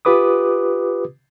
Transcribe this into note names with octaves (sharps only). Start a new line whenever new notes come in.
F4 G4 B4 D6 D#6